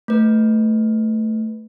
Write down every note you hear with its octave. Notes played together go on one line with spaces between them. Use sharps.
A3 B4